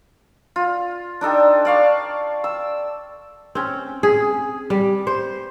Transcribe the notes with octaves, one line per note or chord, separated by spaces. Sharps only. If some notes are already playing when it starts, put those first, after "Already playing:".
F4
D4 D#4 A4 G5
D5 F5 C#6
E6
C4 C#4
G#4
G3
C5